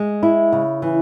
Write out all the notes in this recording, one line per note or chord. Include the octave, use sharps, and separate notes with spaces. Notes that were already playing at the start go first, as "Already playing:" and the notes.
Already playing: G#3
E4
C#3
E3